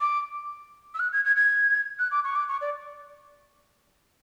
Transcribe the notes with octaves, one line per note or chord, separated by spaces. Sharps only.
D6
E6
F#6
G#6
G#6
G#6
F#6
D6
C#6
D6
C#6
D5